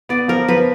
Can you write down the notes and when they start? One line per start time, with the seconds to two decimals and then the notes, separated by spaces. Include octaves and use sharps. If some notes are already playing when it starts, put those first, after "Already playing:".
0.09 B3 D5
0.28 F3 A#4
0.48 F3 B4